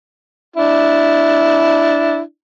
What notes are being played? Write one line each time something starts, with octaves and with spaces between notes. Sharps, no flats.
D4 E4